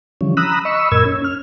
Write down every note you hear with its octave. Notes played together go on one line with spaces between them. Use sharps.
D3 E3 F3 G3 C#4
A#5 B5 D#6 E6 F#6
D#5 B5 C#6 E6
F#2 A#2 A#4 E6 G#6
C#4
F6